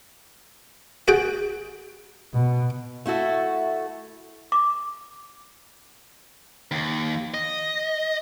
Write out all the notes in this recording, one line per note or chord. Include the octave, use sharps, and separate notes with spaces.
F#4 G#4 G5
B2
A3 E4 F#4 A4
D6
D#2
D#5